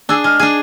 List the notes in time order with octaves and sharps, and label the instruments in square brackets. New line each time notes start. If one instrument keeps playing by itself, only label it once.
[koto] D4 G#4 [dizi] E6
[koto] G#3 [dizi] F6
[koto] D4 G#4